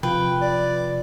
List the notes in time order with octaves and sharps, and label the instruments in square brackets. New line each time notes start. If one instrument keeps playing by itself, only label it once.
[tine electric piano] C3 [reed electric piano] F3 F4 [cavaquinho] B4 [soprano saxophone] G5
[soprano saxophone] D5